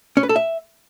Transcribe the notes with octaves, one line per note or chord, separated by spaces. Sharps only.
C#4
B4
A4
E5